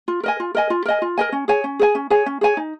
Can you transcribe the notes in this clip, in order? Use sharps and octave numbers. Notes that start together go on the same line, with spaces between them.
F4
A#4 D#5 G#5
F4
A#4 D#5 G#5
F4
A#4 D#5 G#5
F4
A#4 D#5 G#5
C#4
G#4 C#5 G#5
C#4
G#4 C#5 G#5
C#4
G#4 C#5 G#5
C#4
G#4 C#5 G#5
D#4